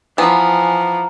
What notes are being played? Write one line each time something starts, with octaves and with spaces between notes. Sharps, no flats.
E3 F3 B3 G#5 A#5